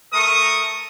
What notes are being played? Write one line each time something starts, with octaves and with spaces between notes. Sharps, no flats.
A3 A#4 C#6 D#6